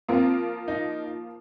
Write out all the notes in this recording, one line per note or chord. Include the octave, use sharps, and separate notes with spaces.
F3 A#3 C4 F4 A#4
D#4